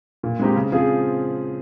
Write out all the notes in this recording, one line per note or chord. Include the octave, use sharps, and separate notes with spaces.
A#2
G#3 C4 D#4 G4
C#3
F3 C4 F4 G#4